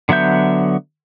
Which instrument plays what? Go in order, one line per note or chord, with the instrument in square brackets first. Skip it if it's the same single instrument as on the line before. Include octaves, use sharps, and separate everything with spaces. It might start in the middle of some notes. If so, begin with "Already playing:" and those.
[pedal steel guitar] D3 F#3 B3 E5 G6